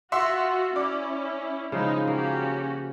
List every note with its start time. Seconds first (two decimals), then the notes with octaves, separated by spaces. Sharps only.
0.12 F4 F#4 E5 F#5 C6
0.76 C#4 E4 D5
1.72 C#3 F3 G#3 D#4 E4
2.07 A#3 C#4 F#4 G4